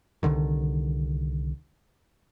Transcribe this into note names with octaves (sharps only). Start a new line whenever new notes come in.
C2 B2 D3 D#3